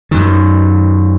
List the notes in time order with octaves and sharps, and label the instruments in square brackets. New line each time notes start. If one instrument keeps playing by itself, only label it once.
[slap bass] F#2 D#3